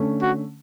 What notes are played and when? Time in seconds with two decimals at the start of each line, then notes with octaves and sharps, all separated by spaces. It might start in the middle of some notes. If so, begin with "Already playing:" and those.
Already playing: D3 A3 C#4
0.22 F#4